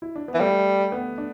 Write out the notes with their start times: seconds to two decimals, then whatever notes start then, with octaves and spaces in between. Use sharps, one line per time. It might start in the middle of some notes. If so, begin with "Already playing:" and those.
0.02 E4
0.16 D4
0.28 B3
0.34 E3
0.40 G3 A3
0.92 B3
1.18 D4